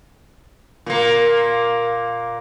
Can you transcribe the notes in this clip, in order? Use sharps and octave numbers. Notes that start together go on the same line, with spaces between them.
A#2 A#3